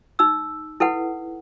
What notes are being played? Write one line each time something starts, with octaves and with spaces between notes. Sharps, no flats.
D#4 E6
E4 A4 B4 F#5